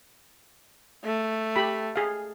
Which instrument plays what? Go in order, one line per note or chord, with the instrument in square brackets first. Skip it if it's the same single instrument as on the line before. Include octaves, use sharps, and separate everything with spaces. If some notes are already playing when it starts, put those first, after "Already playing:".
[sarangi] A3
[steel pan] G4 B5
G#4 F5